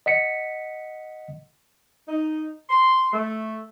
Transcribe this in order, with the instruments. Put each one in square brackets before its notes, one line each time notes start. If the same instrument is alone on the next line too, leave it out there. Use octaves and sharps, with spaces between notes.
[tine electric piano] D#5 F#5 B6 C#7
[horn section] D#4
C6
A3